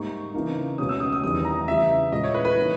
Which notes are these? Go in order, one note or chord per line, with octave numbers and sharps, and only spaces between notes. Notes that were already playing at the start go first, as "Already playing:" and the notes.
Already playing: G#2 G3 A#3 D#4 C#6
C#3 E3 A#3 D#4
C#2 B2 G#3 C#4 D#6
E6
D#6
D#6
E2 D#3 G3 D#6
A#5
C#3 E3 G3 E5
A#2 G#3 C#4 E4 D#5
C#5
B4
B4
E3 A#3 D#4